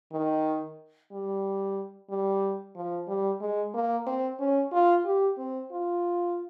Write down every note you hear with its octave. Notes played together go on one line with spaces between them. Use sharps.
D#3
G3
G3
F3
G3
G#3
A#3
C4
C#4
F4
G4
C4
F4